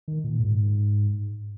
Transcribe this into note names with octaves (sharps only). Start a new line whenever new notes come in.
D#3
A#2
G#2